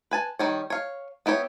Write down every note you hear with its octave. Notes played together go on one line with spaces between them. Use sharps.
B4 G#5 A5
D#3 G3 C#5
C#5 F5
B3 E4 G4 C#5